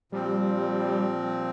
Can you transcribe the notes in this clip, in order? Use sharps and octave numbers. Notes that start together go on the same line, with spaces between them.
A#2 F3 G3 C4